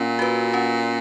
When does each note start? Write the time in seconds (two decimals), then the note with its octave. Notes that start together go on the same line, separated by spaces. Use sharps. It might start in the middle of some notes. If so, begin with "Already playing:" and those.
Already playing: A#2 C#4
0.19 F#4 B4
0.54 C#4